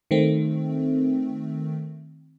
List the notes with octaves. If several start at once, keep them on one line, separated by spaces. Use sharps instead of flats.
D#3 A3 C4